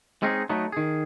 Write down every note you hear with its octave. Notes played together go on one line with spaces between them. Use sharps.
G#3 C4 C#4 D#4 G#4
F#3 A3 B3 D#4
D#3 G#4